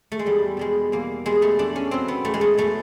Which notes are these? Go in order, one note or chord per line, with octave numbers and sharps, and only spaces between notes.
A3
G#3
E2 G3
B2 G3 G#3
E2 A#3
B2 G3 G#3
A3
E2 D4
C#4
B2 F#3 C4
B3
E2 A3
G#3
A3
B2 F#3 A3